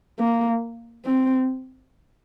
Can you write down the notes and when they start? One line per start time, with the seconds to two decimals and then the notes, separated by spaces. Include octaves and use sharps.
0.19 A#3
1.05 C4